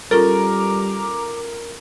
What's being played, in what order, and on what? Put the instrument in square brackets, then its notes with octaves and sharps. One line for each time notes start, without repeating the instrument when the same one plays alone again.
[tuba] G3 [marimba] C#4 F4 A4 [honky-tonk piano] A#4 [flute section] A#5 D6